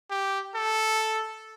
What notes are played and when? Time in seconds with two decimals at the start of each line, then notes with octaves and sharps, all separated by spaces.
0.11 G4
0.56 A4